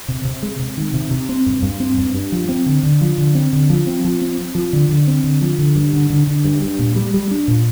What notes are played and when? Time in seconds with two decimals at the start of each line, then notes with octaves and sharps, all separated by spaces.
0.08 C3
0.25 C3
0.43 G#3
0.59 C3
0.77 D#3
0.94 C3
1.11 C3
1.29 C4
1.46 G2
1.63 G2
1.80 C4
1.98 G2
2.15 G2
2.32 F3
2.49 C4
2.66 D3
2.83 D3
3.01 F3
3.18 D3
3.35 C4
3.53 D3
3.70 F3
3.87 C4
4.04 F3
4.22 C4
4.38 C4
4.55 F3
4.73 D3
4.89 D3
5.07 C4
5.24 D3
5.41 F3
5.59 D3
5.76 G2
5.93 D3
6.10 D3
6.27 D3
6.45 G2
6.62 G2
6.79 A#2
6.96 G3
7.14 G3
7.31 D4
7.48 A#2